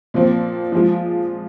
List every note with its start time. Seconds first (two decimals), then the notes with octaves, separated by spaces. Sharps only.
0.14 A#2 F3 C4
0.72 F3 G#3 F4